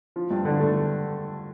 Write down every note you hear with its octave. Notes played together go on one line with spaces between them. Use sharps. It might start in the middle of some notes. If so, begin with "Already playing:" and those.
F3
G2
D3
A3